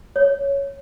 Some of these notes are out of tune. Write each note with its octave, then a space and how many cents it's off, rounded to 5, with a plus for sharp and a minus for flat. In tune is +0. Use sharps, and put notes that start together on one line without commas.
C#5 +5